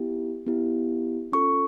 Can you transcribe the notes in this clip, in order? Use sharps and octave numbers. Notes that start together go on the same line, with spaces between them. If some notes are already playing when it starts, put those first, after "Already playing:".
Already playing: B3 E4 G4
B3 E4 G4
C#4 F4 A4 C#6